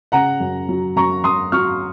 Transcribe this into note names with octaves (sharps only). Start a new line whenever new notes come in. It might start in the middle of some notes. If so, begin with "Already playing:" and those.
C#3 F#5 A#5
F#2
F#3
F#2 A#5 C#6
F#2 C6 D#6
F#3 C#6 F6